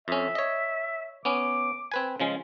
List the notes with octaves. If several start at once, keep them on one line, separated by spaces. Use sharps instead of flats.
F2 C#4 E5
C#5 D#5
B3 C#4 D6
C4 B4 G#5
C#3 F3 G#3 C#4